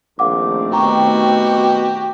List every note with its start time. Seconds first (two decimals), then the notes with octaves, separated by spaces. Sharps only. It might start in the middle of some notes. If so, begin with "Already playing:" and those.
0.19 A#1 D#3 A3 C4 F5 F#5 D6
0.72 B2 F#4 G4 G5 A#5 C#6